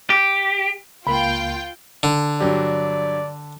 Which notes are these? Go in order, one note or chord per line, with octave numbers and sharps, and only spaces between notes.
G4
C#2 A#3 F4 G5 B5
D3
G2 F#3 G4 D5